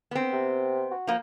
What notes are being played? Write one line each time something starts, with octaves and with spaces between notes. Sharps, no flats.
B3 C4
C3
F#4
F3 A#3